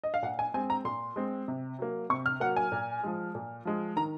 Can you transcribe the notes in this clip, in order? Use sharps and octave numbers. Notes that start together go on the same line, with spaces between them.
D#5
F5
A#2 F#5
G#5
G#3 C4 G#5
A#5
A#2 C6
G#3 C4
C3
F#3 A#3
C3 C#6
F6
F#3 A#3 F#5
G#5
A#2
F3 G#3
A#2
F3 G#3
D#3 A#5